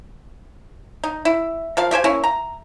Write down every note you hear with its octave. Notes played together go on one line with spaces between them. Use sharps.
D#4
E4
F3 A#4 F5
A3 G4 C5 G#5
A#3 C#4 E4
A#5